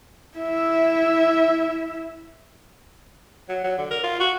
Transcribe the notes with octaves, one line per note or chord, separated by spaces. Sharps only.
E4 E5
F#3
F#3
D3
A#4
F4
F#4